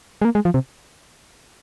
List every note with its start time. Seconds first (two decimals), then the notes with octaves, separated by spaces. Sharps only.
0.22 G#3
0.25 A#3
0.35 G#3
0.45 F3
0.54 C3